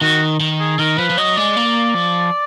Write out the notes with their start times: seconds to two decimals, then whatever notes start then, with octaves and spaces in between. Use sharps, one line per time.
0.01 D#3 F#4
0.40 D#3
0.60 G#4
0.79 D#3 A#4
0.98 F3 B4
1.10 F3
1.17 F#3 D#5
1.37 G#3 D5
1.57 A#3
1.95 F3